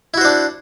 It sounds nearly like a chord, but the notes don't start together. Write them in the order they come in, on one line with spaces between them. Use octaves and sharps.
E4 F#4 C5 D4